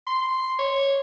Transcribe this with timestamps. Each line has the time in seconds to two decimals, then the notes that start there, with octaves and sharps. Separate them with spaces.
0.07 C6
0.59 C#5